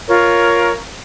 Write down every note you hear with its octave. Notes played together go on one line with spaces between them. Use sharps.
F4 A#4 C#5